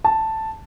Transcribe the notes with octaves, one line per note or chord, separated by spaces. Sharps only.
A5